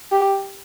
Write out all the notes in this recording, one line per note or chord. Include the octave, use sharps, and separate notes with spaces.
G4